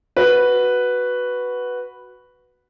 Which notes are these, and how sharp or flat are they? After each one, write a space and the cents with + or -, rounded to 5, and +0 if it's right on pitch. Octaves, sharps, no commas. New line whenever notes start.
F#4 +0 B4 +0